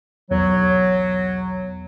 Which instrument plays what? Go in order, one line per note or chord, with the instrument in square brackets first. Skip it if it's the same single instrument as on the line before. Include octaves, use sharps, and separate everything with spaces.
[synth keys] B1 E2 [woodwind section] F#3